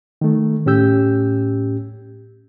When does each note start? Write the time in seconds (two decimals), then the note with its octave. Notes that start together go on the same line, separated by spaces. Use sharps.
0.21 D#3 A3
0.66 A2 C#4 G4 E6 G6